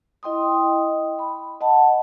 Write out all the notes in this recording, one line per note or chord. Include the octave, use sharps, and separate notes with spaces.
E4 D#5 G5 C6 D#6
B5
D#5 F#5 A5